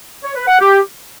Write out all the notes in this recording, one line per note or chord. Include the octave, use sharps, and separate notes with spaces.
C#5
B4
F#5
G4